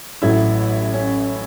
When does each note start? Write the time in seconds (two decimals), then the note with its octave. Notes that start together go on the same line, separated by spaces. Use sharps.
0.22 A1 A2 F#3 E4
0.94 C#4